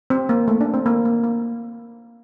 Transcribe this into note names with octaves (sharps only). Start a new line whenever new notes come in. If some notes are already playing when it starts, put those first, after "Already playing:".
C4
A#3
A3
D4
C4
A#3
A#3
A#3